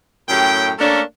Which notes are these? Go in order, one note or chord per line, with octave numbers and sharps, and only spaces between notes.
F#2 A2 C#4 G5
A3 A#3 C#4 D4 A4 A#4